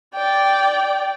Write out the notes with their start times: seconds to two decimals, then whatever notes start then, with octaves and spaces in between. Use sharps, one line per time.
0.15 D5 G5